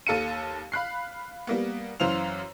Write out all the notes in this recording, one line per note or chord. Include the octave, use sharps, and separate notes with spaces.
D#2 A4 F5 C#7 D#7
F5 B5 F#6 C7
G3 A#3 B3
F#2 E3 C5 F5 F7